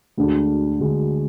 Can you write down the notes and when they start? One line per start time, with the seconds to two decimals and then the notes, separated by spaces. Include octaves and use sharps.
0.17 D2 D3 G#3 D4 F#4
0.80 D2 D3 G#3 D4 F#4